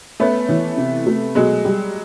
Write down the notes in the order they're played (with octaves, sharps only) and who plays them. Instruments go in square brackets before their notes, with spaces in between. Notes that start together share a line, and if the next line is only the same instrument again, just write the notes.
[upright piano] A3 B3 [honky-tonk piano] C#4
[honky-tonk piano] E3
C3
A3
[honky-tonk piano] B2 [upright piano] F#3 G#3
[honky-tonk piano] G3